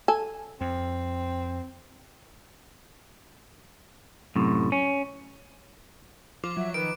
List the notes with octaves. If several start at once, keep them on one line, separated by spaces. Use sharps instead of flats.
A4 G#5
F2 C4
F#2 A2 C3
C#4
F3 F4 D6
F#3 E5
D#3 B4 D7